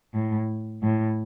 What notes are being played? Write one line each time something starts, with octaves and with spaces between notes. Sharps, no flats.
A2
A2